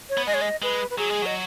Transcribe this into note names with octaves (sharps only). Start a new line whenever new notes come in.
C#5
B3
G#3 D#5
C#5
D#5
G#3 B4
B4
F#3 G#4
G#3
F#3 D#5